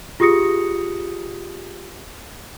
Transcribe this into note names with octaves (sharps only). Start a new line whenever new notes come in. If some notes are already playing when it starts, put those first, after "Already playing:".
F4 G4 G#4 D#6 A#6 C#7